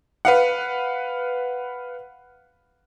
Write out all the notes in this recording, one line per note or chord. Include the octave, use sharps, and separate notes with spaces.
B4 F5 F#5